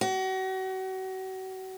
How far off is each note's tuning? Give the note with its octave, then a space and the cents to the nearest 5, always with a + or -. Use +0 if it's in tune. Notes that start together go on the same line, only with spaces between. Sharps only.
F#4 +35